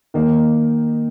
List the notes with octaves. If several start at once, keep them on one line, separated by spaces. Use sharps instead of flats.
D#3 A#3 D#4